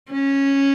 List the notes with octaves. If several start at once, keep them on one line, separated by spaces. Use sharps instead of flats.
C#4